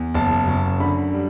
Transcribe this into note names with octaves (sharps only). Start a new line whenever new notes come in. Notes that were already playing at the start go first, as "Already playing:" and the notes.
Already playing: E2
F#1 A5
F#2
D3 B5
G3